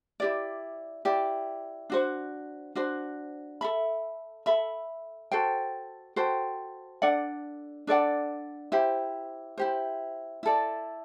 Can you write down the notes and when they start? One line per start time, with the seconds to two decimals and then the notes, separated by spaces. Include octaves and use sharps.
0.20 E4 G4 D5
1.05 E4 G4 D5
1.90 D4 F#4 C5
2.75 D4 F#4 C5
3.61 A4 E5 B5
4.46 A4 E5 B5
5.31 F#4 A4 C5 G5
6.16 F#4 A4 C5 G5
7.02 D4 A4 D5 F#5
7.87 D4 A4 D5 F#5
8.72 E4 G4 C5
9.58 E4 G4 C5
10.43 E4 A4 D5